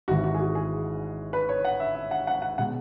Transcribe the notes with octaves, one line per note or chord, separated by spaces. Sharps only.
G#1 G#2 E3 F#4
F#4
G#4
F#4
G#4
B4
C#5
F#5
E5
E5
F#5
F#5
F#5
B2 G#3 F#5